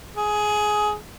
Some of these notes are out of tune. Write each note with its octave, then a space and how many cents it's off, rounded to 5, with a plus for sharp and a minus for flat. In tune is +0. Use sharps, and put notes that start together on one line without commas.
G#4 +15